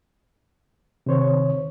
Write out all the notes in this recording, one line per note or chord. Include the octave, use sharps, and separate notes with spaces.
C3 D#3 C5 C#5